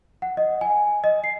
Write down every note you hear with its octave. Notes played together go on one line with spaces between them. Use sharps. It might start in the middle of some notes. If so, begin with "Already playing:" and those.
F#5
D#5
G#5
D#5
C7